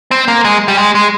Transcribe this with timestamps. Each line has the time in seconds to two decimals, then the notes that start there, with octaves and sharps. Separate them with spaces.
0.11 C4
0.28 A#3
0.45 G#3
0.68 G3
0.78 G#3
0.95 G#3